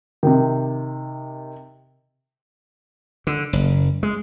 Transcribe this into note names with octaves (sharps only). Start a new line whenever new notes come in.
C3 D#3
D3
F#1
G#3